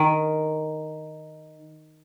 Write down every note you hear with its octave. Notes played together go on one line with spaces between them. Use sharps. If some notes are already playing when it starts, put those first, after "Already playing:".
Already playing: D#3